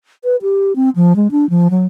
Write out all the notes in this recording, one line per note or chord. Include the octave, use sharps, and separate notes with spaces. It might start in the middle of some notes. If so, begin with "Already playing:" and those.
B4
G4
C4
F3
G#3
D4
F3
F#3